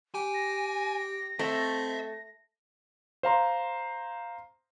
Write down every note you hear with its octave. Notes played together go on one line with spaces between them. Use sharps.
G4 G#5
A#6
A3 C4 D#5 E5
C5 F5 A#5 C6